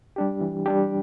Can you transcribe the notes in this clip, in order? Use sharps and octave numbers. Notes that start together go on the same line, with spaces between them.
G3 D4 G4
E3
G3 D4 G4